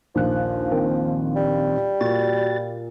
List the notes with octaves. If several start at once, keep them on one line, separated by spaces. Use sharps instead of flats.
A#1 D#2 F3 F#6
D#3 C4
G3
A#2 F#4 A6